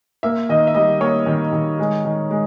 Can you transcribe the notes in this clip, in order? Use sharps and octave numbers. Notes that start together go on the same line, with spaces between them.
A#3 E5
D#3 D#5
E5
G3 D#5
A#3 C#5
D#3
D#3
G#3
D#3
G#3